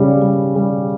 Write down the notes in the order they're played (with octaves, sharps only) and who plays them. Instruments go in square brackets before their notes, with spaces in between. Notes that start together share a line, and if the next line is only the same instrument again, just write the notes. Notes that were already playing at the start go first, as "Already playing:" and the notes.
Already playing: [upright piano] C#3 G3
G3
G3